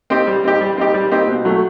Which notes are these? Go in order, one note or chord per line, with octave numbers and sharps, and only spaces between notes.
C4 D#4 G4
G3
C4 D#4 G4
G3
C4 D#4 G4
G3
C4 D#4 G4
B2
F#3 A3